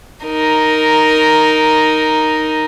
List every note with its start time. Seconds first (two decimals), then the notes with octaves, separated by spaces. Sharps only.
0.24 D#4 A#4